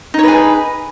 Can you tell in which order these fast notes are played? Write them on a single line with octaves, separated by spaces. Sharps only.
D#4 C#5 B4 G#4